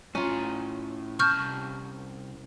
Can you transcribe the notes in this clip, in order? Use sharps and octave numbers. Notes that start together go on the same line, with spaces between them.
A2 C#4 F4 A#5
C2 A5 C#6 F6 G6